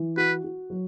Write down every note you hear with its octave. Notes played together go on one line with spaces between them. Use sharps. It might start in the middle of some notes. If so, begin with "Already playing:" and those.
Already playing: E3
F#4 B4
F#4
F#3